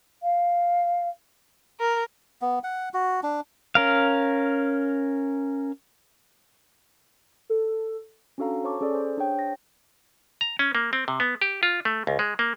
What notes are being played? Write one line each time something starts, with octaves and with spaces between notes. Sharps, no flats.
F5
A#4
B3
F#5
F#4
D4
C#4 A#4 F5
A4
C#4 D4 F#4 A4 F5 A#5
C5 C#5 A5 C#6 D6
C#4 G#4 A4 D5
C5
D4 G#4 C5 C#5 G5
A#6
A#5
C#4
A#3
C4
C3
B3
G4
F4
A3
C#2
G#3
A#3